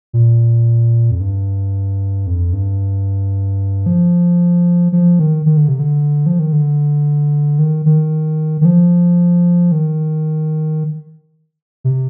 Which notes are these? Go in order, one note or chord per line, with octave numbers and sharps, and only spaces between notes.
A#2
F2
G2
F2
G2
F3
F3
D#3
D#3
D3
C3
D3
F3
D#3
D3
D#3
D#3
D#3
F3
D#3
C3